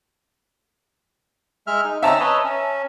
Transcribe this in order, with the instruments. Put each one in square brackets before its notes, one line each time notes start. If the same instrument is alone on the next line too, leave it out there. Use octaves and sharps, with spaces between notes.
[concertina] G#3 E5 F6
D#4
[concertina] C4 C#4 D#4 [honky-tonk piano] E5 A5 A#5
[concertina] B4 C#5 D#5
C#4